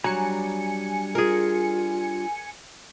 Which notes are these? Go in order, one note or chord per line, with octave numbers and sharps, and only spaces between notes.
F#3 G3 D4 G#5 A#5 C#7
F4 G#4 A#4